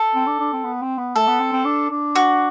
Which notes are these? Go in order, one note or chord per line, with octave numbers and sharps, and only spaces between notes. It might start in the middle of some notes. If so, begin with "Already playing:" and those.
Already playing: A4
C4
D4
D4
C4
B3
C4
B3
A3 A4
B3
C4
C4
D4
D4
F#4